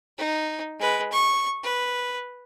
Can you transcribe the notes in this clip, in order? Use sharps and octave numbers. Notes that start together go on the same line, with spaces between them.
D#4
G#3 B4
C#6
B4